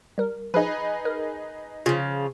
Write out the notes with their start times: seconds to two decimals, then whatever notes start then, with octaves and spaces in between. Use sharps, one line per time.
0.18 G3 A#4
0.54 F3 D#4 G#4 B4
1.05 A#4
1.86 C#3 F3 F4